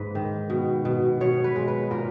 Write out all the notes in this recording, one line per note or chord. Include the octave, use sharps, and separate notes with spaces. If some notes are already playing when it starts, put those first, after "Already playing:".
Already playing: G#2 A#3 B4
D#3
B2
B2
B2 C#5
B4
G#3
B4
A#2 A#4